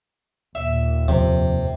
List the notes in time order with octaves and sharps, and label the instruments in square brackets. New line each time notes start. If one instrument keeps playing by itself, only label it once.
[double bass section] D#2 A#2 [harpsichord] E5
[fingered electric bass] F2 F3 [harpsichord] C3